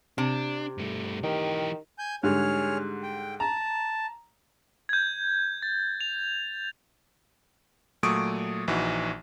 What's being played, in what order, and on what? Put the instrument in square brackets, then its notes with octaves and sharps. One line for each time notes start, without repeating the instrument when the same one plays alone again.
[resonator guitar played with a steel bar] C3 [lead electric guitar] D4
[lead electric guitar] G2 A3
[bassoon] D#3 [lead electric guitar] E3 G4
[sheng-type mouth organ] G#5 G6
[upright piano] G#2 D3 G3 [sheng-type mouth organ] G#4 C#5 F6
[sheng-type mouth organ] G5
[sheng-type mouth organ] A5 [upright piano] A#5
[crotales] G6 G#6
A6
F7
[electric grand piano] A#2 F#3 A3 C#6 D#6 D7
A#1 E3 D#4 F#4